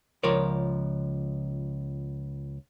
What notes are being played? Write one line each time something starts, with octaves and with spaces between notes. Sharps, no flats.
C#2 F3 A#4 C#5 D5